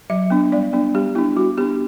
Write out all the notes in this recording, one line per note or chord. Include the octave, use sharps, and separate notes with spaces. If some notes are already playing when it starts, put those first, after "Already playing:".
F#3 E5
B3 D4
G3 D5
B3 D4
G3 G4
B3 D4 E4
G3 F#4
B3 D4 G4